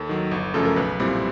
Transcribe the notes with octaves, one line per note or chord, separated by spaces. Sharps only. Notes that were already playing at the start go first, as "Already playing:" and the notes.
Already playing: D#2 A4
D#3 F#3
G1
F#2 C#3 F3 A3 A4
A#4
B1 B4
A#2 G3 C4 E4